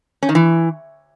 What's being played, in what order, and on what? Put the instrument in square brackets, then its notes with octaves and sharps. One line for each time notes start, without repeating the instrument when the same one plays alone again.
[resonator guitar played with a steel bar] C#4
D#3
E3